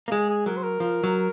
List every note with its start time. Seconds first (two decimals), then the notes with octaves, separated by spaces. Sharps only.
0.08 A#3
0.12 G#3 G#4
0.30 G#4
0.46 F#3 A#4
0.57 C5
0.63 A#4
0.80 F3
1.04 F#3